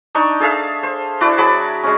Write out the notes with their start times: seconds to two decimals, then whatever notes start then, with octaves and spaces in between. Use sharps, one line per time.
0.15 D4 D#4 C#6
0.40 G#4 A4 E5 F5
0.83 C5
1.21 D4 E4 F#4 D5
1.38 F#3 G#4 B5 D6
1.83 G#3 C#4